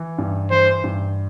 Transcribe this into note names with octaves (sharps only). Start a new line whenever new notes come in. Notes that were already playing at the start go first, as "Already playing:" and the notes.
Already playing: E3
G2
E3 C5
G2